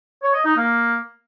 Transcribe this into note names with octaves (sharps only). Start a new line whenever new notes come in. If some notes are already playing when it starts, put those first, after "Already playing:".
C#5
D#5
D#4
A#3